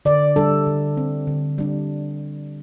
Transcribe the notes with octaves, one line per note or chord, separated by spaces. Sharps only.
D3 D5
G3 D4 A4
D3
C4
D3
G3 D4